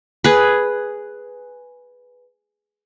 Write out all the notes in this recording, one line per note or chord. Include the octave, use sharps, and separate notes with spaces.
G#4 B4